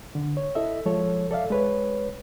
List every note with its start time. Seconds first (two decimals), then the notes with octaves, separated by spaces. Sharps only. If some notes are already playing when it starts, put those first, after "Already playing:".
0.15 D3
0.37 C#5
0.55 E4 A4 D#5 E5
0.86 F3 G#3 A4 C#5
1.31 A4 D5 E5 F5
1.50 G#3 B4 C#5